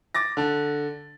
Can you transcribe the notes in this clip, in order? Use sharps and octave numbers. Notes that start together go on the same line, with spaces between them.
D6 A6 A#6
D3 A5